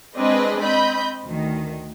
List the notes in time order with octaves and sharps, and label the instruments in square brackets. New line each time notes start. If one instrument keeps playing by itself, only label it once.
[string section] G#3 C4 D4 G#4 B4 D#5
C4 D#5 B5 G6
D2 D#3